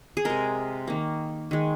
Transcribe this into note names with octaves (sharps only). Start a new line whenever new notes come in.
G#4
C3 G#3 A#4
D#3 A#3
D#3 G#3